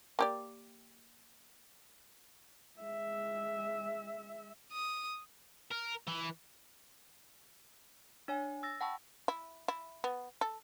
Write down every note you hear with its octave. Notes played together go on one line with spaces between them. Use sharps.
A#3 G4 D5
G#3 E5
D#6
A#4
E3
D4 C#5 G#5
E6 A6 A#6
F#5 G5 A5 B5 C#6 E6
E4
E4
B3
A4